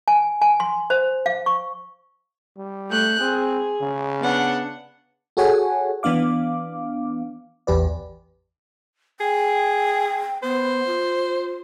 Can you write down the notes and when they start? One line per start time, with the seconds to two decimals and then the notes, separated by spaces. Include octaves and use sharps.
0.08 G#5
0.42 G#5
0.60 C6
0.90 C5
1.26 F5
1.46 C#6
2.57 G3
2.89 A3 F#6 G6
3.20 C4 G#4
3.81 C#3
4.20 B3 D4 F#5
5.37 F#4 G#4 A4 C#5 F#5 G#5
6.03 E3 B3 D4 F5 D6
7.67 A1 E2 G4 B4 D5
9.20 G#4 G5
10.43 B3 C5
10.87 F4